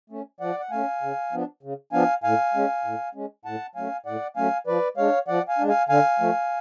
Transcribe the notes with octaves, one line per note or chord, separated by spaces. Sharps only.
A3 C#4
F3 D5 F#5
F#5
A3 C#4 F5 G#5
C#3
F3 B3 D4
C#3
F3 B3 D4 F5 G#5
A2 F5 G#5
G#3 C#4
A2
G#3 C#4
A2 F#5 A5
F#3 A3 C#4 F5 G#5
A2 D5 F#5
F#3 A3 C#4 F5 G#5
F3 B4 D5
G#3 D4 C#5 F5
F3 D5 F#5
F5 G#5
G#3 D4
F5 G#5
D3 F5 G#5
F3 A3